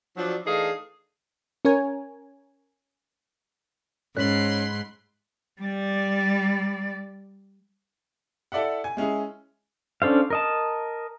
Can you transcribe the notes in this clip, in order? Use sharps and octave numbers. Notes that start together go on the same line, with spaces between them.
F3 F#3 D4
E3 A3 D4 D#4 G#4 F5
C#4 A#4 C#5 G#5
G#2 C#4 B5 C6 F#6 B6 F#7
G3 D5
E4 A4 D5 E5 F#5
G#5
G#3 C#4 E4 G#4
C#4 D4 A4 C5 F5
A#4 D#5 A5